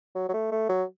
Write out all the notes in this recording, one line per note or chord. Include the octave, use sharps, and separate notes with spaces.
F#3
F#3
A3
A3
F#3